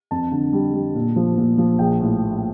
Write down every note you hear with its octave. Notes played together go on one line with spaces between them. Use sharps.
F2 A5
D3
G3
G3
A#2
F3
A#2
F3
A#1 G5
A2
A#1